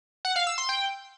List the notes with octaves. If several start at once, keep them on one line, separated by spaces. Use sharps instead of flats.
F#5
F5
E6
C6
G5